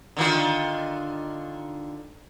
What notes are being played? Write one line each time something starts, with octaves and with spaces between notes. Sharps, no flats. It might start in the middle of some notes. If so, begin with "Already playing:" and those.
D3 D#3 F4